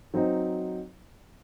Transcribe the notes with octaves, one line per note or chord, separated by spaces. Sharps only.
F#3 C4 D#4